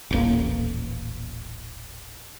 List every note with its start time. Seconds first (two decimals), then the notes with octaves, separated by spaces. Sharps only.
0.11 D#1 A1 A#3